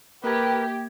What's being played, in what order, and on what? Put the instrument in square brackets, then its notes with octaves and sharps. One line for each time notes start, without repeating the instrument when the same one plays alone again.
[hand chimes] A#3 G#6 [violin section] G4 [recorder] A#4 [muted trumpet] B4